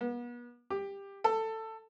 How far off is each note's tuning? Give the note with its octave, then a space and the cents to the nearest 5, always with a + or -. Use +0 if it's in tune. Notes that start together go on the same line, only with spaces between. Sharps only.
B3 -35
G4 +15
A4 +15